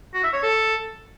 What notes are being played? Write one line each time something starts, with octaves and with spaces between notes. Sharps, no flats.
F#4
E5
C#5
A4